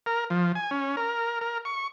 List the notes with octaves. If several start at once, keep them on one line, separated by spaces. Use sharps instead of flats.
A#4
F3
G#5
C#4
A#4
A#4
C#6